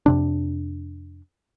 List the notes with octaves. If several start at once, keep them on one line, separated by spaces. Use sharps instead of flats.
F2 C3 D4